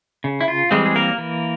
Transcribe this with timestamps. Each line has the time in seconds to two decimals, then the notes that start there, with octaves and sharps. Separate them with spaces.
0.24 C#3
0.41 E4
0.48 F4
0.71 E3 G3 G#3 C4 G#4
0.86 G#4
0.95 A#3 A#4
1.18 E3